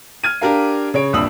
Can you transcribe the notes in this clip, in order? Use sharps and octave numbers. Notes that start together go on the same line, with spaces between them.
F6 G#6 D#7
D4 G4 A#4 F5
C#3 C#5 D7
D#1 C2 G2 D#6 E6 F#7